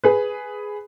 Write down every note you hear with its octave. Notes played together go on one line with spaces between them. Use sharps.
G#4 B4